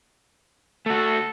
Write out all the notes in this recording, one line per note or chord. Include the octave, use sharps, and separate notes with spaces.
A3 F#4 A4